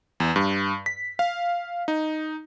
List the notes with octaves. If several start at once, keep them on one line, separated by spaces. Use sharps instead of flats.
E2
G2
B6
F5
D#4